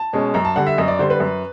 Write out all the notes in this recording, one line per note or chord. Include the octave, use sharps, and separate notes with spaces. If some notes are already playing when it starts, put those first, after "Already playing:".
Already playing: A5
B2 G#3 C#4
F#2 A#5
A5
D3 G3 F#5
E5
F#2 D#5
D5
D3 G3 C5
B4
F#2